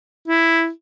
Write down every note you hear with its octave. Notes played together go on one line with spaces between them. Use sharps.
E4